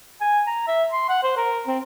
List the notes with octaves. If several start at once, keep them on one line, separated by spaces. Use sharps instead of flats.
G#5
A#5
E5
C6
F#5
C5
A#4
C4